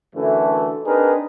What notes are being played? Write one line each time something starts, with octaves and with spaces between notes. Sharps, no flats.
F#2 D3 E3 A3
C4 D4 D#4 G#4 A#4 B4